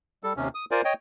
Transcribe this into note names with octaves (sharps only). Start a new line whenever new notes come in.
G3 A4
D#2 C3 C#4
D#6
F4 A#4 C5 D5 G#5
C#5 D#5 G5